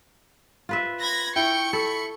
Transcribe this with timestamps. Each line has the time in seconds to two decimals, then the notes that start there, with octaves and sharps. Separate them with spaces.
0.69 F4 B4 E5
1.01 B5 G#6 A#6
1.36 E4 G5 C#6 C#7
1.73 A4 B5